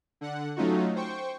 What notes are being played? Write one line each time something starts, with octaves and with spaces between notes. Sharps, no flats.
D3 F#5
F#3 A3 C#4 D#4 F4 F#4
C5 G5 C#6